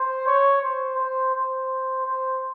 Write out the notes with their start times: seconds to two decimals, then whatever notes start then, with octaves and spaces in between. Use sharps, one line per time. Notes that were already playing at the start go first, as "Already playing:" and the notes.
Already playing: C5
0.27 C#5
0.62 C5
0.98 C5
1.34 C5
2.05 C5